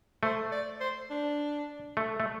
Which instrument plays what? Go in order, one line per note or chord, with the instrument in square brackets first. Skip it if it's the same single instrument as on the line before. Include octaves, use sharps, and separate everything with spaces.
[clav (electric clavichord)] A3 [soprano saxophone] C5
[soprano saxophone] D5
C5
D4
[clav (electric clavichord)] A3
A3